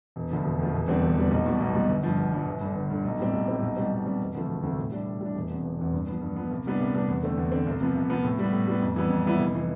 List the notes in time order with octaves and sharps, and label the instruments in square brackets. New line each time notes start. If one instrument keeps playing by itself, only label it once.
[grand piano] E1
D2 D3 F3
E1
D2 D3 F3
E1
E2 D3 G3 C4
E1
E2 D3 G3 C4
B1
B2 G3
B1
B2 G3
G1
G2 F3
G1
G2 F3
G1
G2 D3
G1
G2 D3
B1
A2 G3 C4
B1
A2 G3 C4
B1
B2 G3 C4
B1
B2 G3 C4
E1
D2 C3 F3 A3
E1
D2 C3 F3 A3
A2
G3 D4
A2
G3 D4
E1
E2 C3
E1
E2 C3
G2
F3 B3
G2
F3 B3
C2
C3 G3 B3 D4
C2
C3 G3 B3 D4
E2
D3 A3 C4
E2
D3 A3 C4
C2
C3 F3 B3
C2
C3 F3 B3
A2
G3 B3
A2
G3 B3
F2
E3 G3 B3 E4
F2
E3 G3 B3 E4
F1
E3